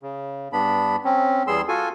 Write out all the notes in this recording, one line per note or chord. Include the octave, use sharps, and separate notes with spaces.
C#3
G2 B3 D4 B5
C4 C#4
E2 G3 B3 G#4 C6 E6
F4 F#4 A4 G#5